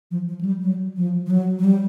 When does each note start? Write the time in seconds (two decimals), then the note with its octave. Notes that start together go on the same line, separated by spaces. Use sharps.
0.11 F3
0.28 F3
0.41 F#3
0.45 G3
0.62 F#3
0.97 F3
1.26 F3
1.30 F#3
1.59 F#3
1.64 G3